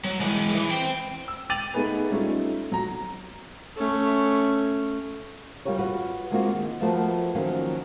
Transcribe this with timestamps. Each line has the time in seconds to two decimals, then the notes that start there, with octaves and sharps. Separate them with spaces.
0.04 F#3
0.20 E3 G#3
0.54 E3
0.70 C5 G5
1.28 E6
1.50 G5 D6 A6 D#7 F7 F#7
1.73 A3 B3 D#4 G#4 B4 G#5
2.11 G3 A3 C#4 D#4 F4
2.72 F#3 A#5
3.77 A3 C#4
5.65 G3 F4 G4 A#4 C#5
5.79 F4 F#4 B4
6.31 G#3 A#3 C4 F4 F#4
6.54 D#3
6.81 F3 A3 B3 F#4 A#4 C5
7.35 D#3 F3 F#3 A#3 C#4